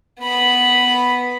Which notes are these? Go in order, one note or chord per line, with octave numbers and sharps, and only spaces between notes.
B3 B5